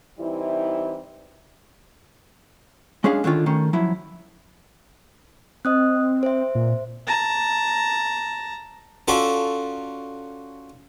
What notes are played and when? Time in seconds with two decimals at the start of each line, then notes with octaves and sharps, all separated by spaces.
0.19 E3 G3 C4 D#4 E4
3.04 G#3 C#4 D4 G#4 F5
3.24 D3 D#3 C#4 F4
3.46 D#3 A3 C#4
3.73 F3 F#3 E4
5.65 C4 D#5 D#6 F#6
6.23 C5 E5
6.55 A#2
7.07 A5 A#5
9.08 C#4 F4 F#4 A4 D5